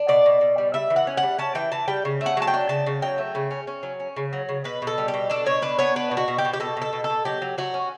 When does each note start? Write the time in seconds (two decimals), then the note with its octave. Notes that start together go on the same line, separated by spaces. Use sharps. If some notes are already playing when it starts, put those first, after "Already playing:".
Already playing: D4
0.08 B2 D5
0.26 B2
0.41 B2
0.58 G3
0.74 G3 E5
0.90 E3
0.96 F#5
1.07 C#4
1.17 F#5
1.23 G3
1.39 C#4 A5
1.55 E3 G5
1.72 E3 A5
1.88 G3 G5
2.05 C#3
2.21 A3
2.26 F#5
2.37 F#3 A5
2.47 G5
2.54 D4
2.69 C#3 A5
2.86 C#3
3.02 F#3 G5
3.18 A3
3.35 C#3
3.51 C#4
3.67 C#4
3.83 F#3
4.00 C#4
4.16 C#3
4.33 F#3
4.49 C#3
4.64 B2 B4
4.82 B2
4.87 A4
4.98 G3
5.08 G4
5.14 B2
5.30 D4 A4
5.46 B2 C#5
5.62 D4 B4
5.79 B3 C#5
5.96 D4 B4
6.11 B2
6.17 F#4
6.28 B2
6.38 G4
6.45 B2
6.53 G4
6.60 B2 A4
6.77 B2
6.82 A4
6.93 B2
7.04 A4
7.10 B2
7.25 F#3 G4
7.42 F#3
7.58 F#3 F#4
7.74 C#4